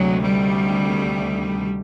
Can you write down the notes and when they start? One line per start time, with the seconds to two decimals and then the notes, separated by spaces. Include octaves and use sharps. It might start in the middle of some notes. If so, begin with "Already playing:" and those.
Already playing: D2 C3 D#3 F#3 G#3
0.23 G3 A3